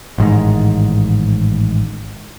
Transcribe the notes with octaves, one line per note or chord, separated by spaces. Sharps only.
A1 G#2 D#3